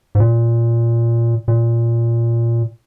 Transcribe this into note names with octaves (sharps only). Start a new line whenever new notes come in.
G#2
A#2
A#2